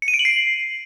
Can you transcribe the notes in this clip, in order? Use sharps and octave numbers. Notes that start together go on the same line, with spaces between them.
C#7
D#7
D7
F#7
C7